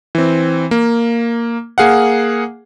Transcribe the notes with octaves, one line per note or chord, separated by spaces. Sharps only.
E3 C4
A#3
A#3 G#4 F5 F#5